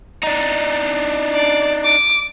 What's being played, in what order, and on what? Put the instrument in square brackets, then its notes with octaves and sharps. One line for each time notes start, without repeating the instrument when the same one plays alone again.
[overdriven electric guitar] D4 D#4
[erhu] D5
D6